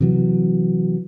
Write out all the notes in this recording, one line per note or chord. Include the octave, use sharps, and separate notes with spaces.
C3 E3 F#3